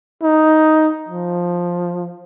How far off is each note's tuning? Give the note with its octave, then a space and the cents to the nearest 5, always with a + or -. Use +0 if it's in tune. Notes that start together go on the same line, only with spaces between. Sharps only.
D#4 +5
F3 +10